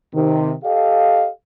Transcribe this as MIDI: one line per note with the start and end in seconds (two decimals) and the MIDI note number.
0.14 0.53 48
0.14 0.53 51
0.64 1.28 67
0.64 1.28 69
0.64 1.28 75
0.64 1.28 77